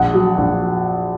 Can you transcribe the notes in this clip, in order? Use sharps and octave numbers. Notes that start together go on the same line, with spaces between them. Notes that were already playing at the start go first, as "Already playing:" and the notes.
Already playing: A#1 F#5
F#3
A#1